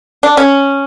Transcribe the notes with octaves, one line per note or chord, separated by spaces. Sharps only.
D4
C#4